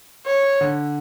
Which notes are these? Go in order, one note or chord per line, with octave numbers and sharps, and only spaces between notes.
C#5
D3